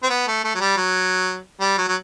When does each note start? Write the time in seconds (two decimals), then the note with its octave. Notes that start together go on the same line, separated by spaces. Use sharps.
0.03 C4
0.10 B3
0.27 A3
0.44 A3
0.55 F#3
0.60 G3
0.77 F#3
1.60 G3
1.78 F#3
1.88 F#3